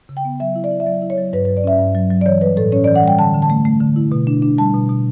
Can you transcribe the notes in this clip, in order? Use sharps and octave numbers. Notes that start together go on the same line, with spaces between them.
C#3
G5
B3
F#3 E5
E4
D5
E4
E5
F#3 D5
E4
C#5
F#3
G2 B4
B4
F#3
D5
C#4 E5
G2
F#3
F#3
D5
E3 C#5
G3 B4
A2 A4
C#4 C#5
D5
E3
F#5
G3 G5
D3 A5
D3
A5
A3
A3
D3
E4
B2
D4
D4
G3 A5
B2
B2